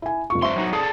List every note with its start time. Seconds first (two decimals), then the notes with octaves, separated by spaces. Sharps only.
0.02 E4 G#5
0.30 F1 F4 C#6
0.42 G2 C5 E5 C6 C#6
0.56 F#3 D#4 F#4
0.73 G#4 A4 D5 D#6 C7